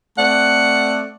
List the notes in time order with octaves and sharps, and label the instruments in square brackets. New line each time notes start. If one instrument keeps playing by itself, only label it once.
[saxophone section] A3 C4 D5 F#5